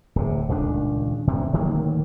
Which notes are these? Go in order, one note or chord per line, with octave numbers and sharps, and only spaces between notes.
D1 C3
D#1 C#2 D#3 D4
D2 G2 C3
D1 D#3 F#3 A#3